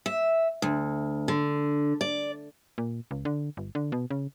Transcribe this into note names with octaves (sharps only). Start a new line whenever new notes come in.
E5
D2
D3
D5
A#2
C#2
D3
G1
D3
B2
C#3